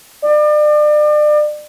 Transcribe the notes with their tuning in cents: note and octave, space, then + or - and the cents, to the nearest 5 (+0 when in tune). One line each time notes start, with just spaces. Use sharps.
D5 +35